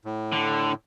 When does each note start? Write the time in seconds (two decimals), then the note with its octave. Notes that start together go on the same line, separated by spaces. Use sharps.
0.05 A2
0.32 D3